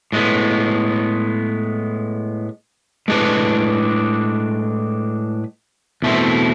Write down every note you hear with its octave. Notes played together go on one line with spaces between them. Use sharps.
A2 G#3 B3
A2 G#3 D4 G#4 B4
E2 B2 A3 C4 E4